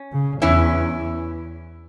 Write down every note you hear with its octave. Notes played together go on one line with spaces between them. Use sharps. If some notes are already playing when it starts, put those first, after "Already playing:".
Already playing: C#4
C#3
E2 E3 C#4 E4